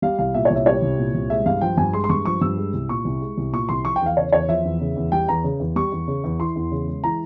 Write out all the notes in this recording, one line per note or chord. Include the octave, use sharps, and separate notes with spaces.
G3 F5
C2 F5
A#2 E5
C#5
C2
E5
G3 C#5
C2
A#2
C2
G#3 E5
G2 F5
F3 G5
G2 G#5
G#3 C6
C6
G2 C#6
F3 C#6
G2 E6
G#3
C2
A#2 C#6
C2
G#3
C2
A#2 C#6
C2 C6
F3 C#6
G5
E2 F5
C#3 C#5
E2 C#5
F3 E5
E2
C#3
E2
G3 G5
E2 A#5
C#3
E2
G3 C#6
E2
C#3
E2
E3 C6
E2
C#3
G#3
E3 A#5